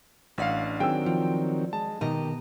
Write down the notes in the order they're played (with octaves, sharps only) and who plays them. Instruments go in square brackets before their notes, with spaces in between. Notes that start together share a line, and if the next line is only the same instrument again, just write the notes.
[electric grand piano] A1 F5 [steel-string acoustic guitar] D4 D5 F#5
[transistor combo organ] D#3 F#3 C4 [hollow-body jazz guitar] G#4 [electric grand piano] G5 E6
[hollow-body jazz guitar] F3
[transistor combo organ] G#3 [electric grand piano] A5
[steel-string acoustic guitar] B2 D#5 A#5 [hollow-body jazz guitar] D#3 [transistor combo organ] G4